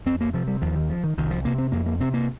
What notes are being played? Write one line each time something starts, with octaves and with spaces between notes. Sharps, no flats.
F2 C4
A#3
C3 F3
G3
D#2 F3
D#3
F3
D#3
C2 D#3
F3
C3 A#3
C4
F2 A#3
A#3
C3 C4
A#3